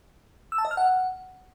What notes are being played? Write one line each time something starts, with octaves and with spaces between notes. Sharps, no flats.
E6
A5
D#5
F6
F#5